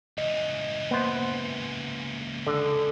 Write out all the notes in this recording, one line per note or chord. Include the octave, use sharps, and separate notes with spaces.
C#2 E3 D#5
A#3 B3 C5
D3 A4